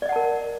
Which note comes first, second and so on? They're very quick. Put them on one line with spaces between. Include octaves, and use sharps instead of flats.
D5 D#5 F#5 A5 A#4